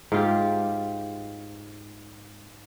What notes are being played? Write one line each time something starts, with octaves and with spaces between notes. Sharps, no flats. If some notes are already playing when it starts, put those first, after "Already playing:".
G#2 F4 G4